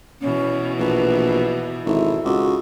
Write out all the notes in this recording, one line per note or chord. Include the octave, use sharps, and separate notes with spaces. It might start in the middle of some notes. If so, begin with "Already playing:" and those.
B2 E3 C#4
A#1 B4
G#1 E4 A4
C#2 F#4